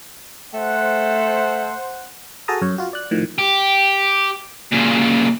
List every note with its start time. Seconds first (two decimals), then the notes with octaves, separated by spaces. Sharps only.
0.54 A3 C5 F#5
2.48 F#4 G#4 A4 A5 A#5 D#6
2.62 F#2 C#5
2.78 F4 F#4
2.93 D5 F#6
3.11 A2 D#3 F3
3.38 G4
4.72 A#2 C#3